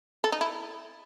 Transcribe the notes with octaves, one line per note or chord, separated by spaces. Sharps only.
A4
D#4
E4